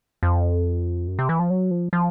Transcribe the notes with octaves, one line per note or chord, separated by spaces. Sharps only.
F2
F#2
C3
E3
F3
F#3
F3
F3